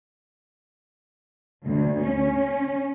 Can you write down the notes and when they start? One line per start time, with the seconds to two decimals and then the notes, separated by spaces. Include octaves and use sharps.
1.66 D2
2.03 C#4